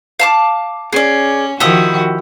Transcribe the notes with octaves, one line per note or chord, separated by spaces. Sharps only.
F5 A5 D6
C#4 G#4 D5
D#3 F3 E4 F#4 G4 D#6